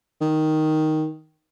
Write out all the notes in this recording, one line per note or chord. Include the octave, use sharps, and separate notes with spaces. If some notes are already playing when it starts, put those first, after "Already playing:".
D#3